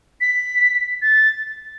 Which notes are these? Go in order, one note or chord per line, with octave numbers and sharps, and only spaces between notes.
B6
A6